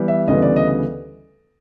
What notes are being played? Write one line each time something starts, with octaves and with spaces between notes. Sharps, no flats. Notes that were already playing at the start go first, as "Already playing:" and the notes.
Already playing: E3 G3 B3
E5
D2 C#3 E3 G3 B3 D#5
D5
D#5